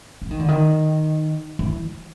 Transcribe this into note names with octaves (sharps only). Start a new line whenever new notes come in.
E3
D#3
D3
D#3
E3